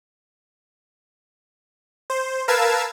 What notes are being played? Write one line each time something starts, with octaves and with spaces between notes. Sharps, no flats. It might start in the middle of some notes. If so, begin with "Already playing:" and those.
C5
A#4 B4 F5 A5 E6 G#6